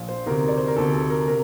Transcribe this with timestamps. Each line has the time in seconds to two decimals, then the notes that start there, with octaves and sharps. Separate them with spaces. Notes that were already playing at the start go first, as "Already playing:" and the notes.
Already playing: A#1 A#2 F3
0.09 C5
0.26 D2 C3 D#3 A#4
0.48 D5
0.58 C5
0.68 A#4
0.76 D2 C3 D#3 A4
0.93 A4
1.10 A#4
1.28 C3 A#4